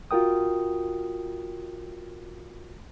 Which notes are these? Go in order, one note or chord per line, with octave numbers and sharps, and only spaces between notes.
F4 F#4 A#4 G5 D#6